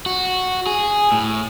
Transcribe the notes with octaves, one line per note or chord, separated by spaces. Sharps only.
F#4
G#4
A2